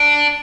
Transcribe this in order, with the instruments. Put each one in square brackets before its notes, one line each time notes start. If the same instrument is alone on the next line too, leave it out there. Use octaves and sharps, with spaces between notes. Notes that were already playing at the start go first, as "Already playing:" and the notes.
Already playing: [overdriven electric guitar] D4